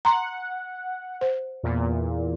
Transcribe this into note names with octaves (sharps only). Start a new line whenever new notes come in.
F#5 A#5 C6
C5
E2 A#2